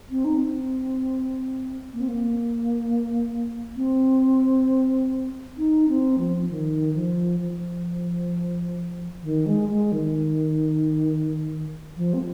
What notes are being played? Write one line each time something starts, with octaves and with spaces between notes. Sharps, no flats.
C4
D#4
C4
A#3
C4
A#3
C4
D#4
C4
F3
D#3
F3
F3
D#3
G#3
G#3
D#3
F3
C4